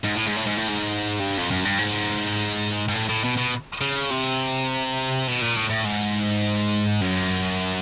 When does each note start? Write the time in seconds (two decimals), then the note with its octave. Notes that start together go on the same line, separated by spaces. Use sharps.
0.04 G#2
0.15 A2
0.26 G#2
0.36 A2
0.47 G#2
0.57 A2
0.68 G#2
1.20 G2
1.37 F2
1.51 F#2
1.65 G2
1.79 G#2
2.88 G#2
2.94 A2
3.09 A2
3.24 B2
3.38 B2
3.81 C#3
4.10 C3
5.27 B2
5.41 A#2
5.57 A2
5.70 A2
5.85 G#2
7.01 F#2